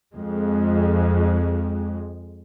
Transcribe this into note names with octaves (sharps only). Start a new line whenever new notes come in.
F2 G#3